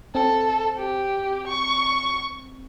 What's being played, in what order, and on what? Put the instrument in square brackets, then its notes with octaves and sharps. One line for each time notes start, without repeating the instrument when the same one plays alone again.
[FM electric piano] C4 [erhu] A4
[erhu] G4
C#6